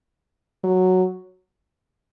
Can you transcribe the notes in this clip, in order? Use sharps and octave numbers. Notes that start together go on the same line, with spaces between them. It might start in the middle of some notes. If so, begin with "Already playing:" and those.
F#3